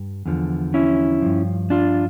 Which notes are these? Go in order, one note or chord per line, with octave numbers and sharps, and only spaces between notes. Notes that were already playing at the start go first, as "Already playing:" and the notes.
Already playing: G2
E2 D3 F3
C#4 E4
G2 F3
D4 F4